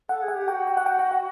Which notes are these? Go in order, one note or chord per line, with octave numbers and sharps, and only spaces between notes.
A4 F#5
G#4
F#5
G4
F#4 G5
G5
F#5
G5
F#5
F#5